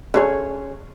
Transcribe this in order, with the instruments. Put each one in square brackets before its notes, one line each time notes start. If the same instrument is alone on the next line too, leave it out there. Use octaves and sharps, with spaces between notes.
[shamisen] D3 G3 A3 [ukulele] C#4 G#4 C#5